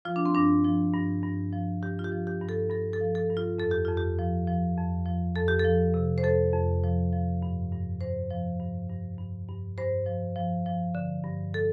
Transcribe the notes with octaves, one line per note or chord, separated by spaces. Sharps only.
F3 F4
D4
C4
G2 D4
F3
G2
G2
F3
G2 G4
F4
G4
F3
G4
G2
A4
G2 A4
A4
F3
A4
G2
F4
F2 A4
G4
F2 F4
G4
F3
F3
F2
F3
F2 A4
G4
A4
F3
C3
C5
F2 A4
F2
F3
F3
G2
G2
G2 C5
F3
G2
G2
G2
G2
G2 C5
F3
F3
F3
D3
G2
A4